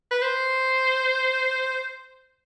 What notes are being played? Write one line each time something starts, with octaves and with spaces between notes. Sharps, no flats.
B4
C5